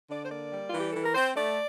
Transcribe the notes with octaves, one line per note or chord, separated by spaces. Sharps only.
D3 D5
C5
A#3 D5
G3
E3 F4
G4
E3 A4
A#4
C4 C5
A3 D5